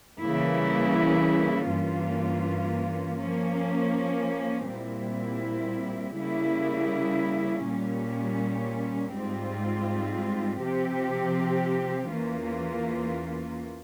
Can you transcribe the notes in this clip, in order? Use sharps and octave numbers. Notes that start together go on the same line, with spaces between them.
C#3 E3 G3 A#3 E4
G2 E3 A#3 C#4 F4
F3 A#3 C#4
A#2 G3 C4 E4
C#3 G3 A#3 E4
A#2 G3 C#4
G#2 G3 C4 F4
C3 F3 C4 G4
E2 E3 A#3 C#4 F4